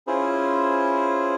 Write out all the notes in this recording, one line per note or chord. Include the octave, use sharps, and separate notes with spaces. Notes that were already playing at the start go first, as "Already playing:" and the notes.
C#4 E4 F4 G#4 C5